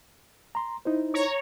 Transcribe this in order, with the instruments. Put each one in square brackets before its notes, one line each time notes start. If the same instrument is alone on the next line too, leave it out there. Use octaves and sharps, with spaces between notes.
[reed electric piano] A#5 C6
D#4 E4 C5
[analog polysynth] C#5 A#5 C#6